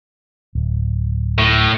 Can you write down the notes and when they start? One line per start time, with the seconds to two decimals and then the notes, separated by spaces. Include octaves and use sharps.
0.55 D1
1.38 A2